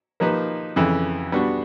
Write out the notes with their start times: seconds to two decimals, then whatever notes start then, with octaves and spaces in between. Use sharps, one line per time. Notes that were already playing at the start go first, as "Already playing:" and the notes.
0.20 F3 A#3 D#4 G4 B4
0.76 F2 C#3 E3
1.32 G3 B3 D4 F#4